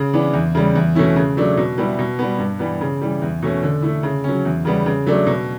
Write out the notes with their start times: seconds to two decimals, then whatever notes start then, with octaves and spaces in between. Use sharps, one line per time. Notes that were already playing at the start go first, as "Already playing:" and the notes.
Already playing: C#3
0.13 E3 B3 D4
0.34 E2
0.55 C#3 G3
0.75 E2
0.95 B2 A3 C#4 E4
1.16 C#3
1.37 F#3 A3 D4
1.57 B2
1.78 G3 B3 E4
1.99 B2
2.19 G3 B3
2.39 G2
2.59 E3 G3 B3
2.81 C#3
3.01 E3 G3
3.22 E2
3.42 B2 A3 C#4
3.63 D3
3.82 A3 E4
4.03 C#3
4.24 F#3 C#4
4.45 E2
4.65 C#3 G3 B3
4.86 C#3
5.07 F#3 A3 D4
5.27 B2